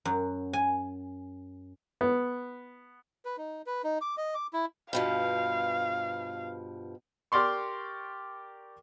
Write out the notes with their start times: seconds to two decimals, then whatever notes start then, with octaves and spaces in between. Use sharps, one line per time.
0.05 F#2
0.53 G#5
2.01 B3
3.25 B4
3.37 D#4
3.66 B4
3.84 D#4
4.01 D6
4.17 D#5
4.35 D6
4.53 E4
4.93 G2 B2 F3 F5
7.32 G4 A#4 D5 C6 C#6